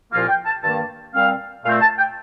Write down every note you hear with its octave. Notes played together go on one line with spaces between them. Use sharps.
C2 A#2 F3 A#3 F4 F5
G5
A5
G2 D#3 A#3 A5
A#2 G3 C4 F5
A#2 A3 C4 F5
A5
G5